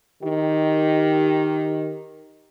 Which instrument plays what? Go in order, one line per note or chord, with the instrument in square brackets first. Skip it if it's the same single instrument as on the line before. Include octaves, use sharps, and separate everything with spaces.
[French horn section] D#3 G4